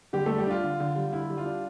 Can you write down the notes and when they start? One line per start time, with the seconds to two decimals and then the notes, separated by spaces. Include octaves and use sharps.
0.13 D3 G3 G4
0.26 G3 A3 A4
0.38 G3 G4
0.47 D4 F4
0.64 D3
0.80 D3
0.96 G3
1.13 D3 E4
1.29 G3
1.38 F4
1.46 D4